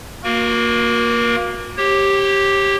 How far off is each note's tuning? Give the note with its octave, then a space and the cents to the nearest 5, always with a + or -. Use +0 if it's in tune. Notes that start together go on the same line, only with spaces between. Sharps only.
A#3 +0 F#4 -30 A#4 +35
G4 +0 C#5 -35